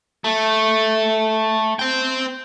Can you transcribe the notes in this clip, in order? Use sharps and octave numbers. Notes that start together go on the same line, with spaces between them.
A3
C5 G5